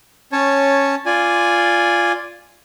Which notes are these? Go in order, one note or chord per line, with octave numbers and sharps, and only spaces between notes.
C#4 C#5 A5
F4 D5 G#5